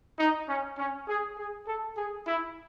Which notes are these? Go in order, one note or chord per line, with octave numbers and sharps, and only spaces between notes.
D#4
C#4
C#4
G#4
G#4
A4
G#4
E4